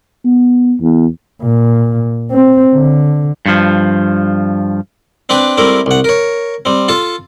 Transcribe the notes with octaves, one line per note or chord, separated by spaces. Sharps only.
B3
E2
A#2
C4
D3
G2 F3
C4 D4 B4 G5 D6
G3 A3 C4 E4 A#4
C2 F#5
A#4 C#5
G3 C4
F4 A4 A5